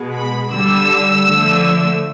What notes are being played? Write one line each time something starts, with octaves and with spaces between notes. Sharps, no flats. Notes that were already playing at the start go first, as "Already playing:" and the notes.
Already playing: B2 G#3
B5
D3 G3 E6
D3 F3 A3